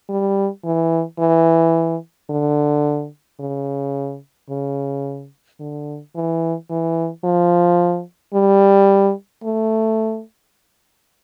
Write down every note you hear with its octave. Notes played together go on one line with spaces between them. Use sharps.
G3
E3
E3
D3
C#3
C#3
D3
E3
E3
F3
G3
A3